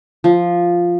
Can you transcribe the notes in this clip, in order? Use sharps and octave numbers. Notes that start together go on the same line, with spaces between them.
F3